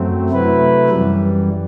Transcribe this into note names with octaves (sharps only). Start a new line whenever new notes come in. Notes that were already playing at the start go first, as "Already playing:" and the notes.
Already playing: F#2 F#3 A3 C4
C3 F#3 A3 E4 B4
F#2 E3 G3